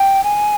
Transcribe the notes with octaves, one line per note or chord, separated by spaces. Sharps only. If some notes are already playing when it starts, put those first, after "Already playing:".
Already playing: G5
G#5